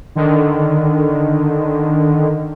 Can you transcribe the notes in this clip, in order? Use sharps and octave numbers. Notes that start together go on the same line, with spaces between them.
D3 D#3